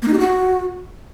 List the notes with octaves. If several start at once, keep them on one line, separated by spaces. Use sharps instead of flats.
A#3
D#4
G4
F#4